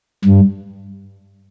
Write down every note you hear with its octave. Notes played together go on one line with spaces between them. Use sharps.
G2